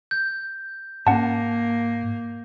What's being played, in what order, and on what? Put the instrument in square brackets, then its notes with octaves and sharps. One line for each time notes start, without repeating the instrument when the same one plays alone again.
[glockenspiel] G6
[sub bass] G#2 [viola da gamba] A#3 [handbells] C#4 F#5 A5